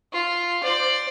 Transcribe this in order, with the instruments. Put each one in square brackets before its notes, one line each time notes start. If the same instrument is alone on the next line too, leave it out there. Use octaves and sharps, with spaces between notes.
[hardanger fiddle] F4
C5 D5